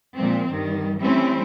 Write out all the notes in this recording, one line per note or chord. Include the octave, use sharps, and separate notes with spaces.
A#2 F3 G#3 C4
G2 D#3 G3
E3 G3 A3 C4 C#4 E4